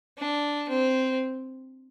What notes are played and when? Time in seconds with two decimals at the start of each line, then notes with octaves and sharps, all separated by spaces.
0.19 D4
0.69 C4